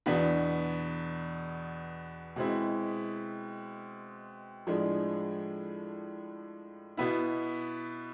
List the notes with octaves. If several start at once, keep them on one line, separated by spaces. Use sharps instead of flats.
E2 B2 B3 D4
B2 G#3 C4 E4
A2 F3 G#3 D4
B2 B3 E4